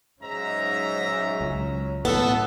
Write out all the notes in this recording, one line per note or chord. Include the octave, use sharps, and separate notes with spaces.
G#2 F#3 C#4 E5 A#5
C#2
A2 B3 A4